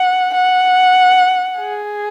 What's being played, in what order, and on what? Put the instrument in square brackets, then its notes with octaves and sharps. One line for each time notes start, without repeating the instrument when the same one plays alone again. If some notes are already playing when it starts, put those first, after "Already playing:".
Already playing: [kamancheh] F#5
F#5
G#4